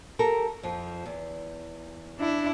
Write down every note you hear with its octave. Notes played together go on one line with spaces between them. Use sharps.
G4 A4 A#4
F2 F3
E2
D4 E4